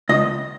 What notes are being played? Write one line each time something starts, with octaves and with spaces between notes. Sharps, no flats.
C#2 D#5